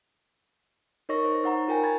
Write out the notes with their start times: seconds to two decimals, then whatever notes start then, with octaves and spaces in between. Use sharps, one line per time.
1.09 D#4 A#4 C#5 D#5 C#6 A#6
1.25 C5
1.44 D#4 F#5 A#5
1.68 F4 A#4 G5 G#5
1.83 B5 G#6 A6